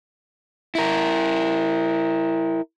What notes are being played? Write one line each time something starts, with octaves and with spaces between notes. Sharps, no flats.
E4 A#4